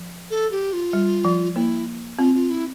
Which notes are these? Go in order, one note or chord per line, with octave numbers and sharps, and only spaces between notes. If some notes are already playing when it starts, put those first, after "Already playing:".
Already playing: F3
A4
G4
F4
G3
F3
A#3 E4
C4 F4
F4
E4